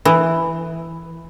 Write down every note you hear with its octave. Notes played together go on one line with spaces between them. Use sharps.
E3